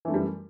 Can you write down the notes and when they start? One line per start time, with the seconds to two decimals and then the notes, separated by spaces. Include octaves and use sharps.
0.05 E3
0.08 A3
0.11 F#2
0.14 G3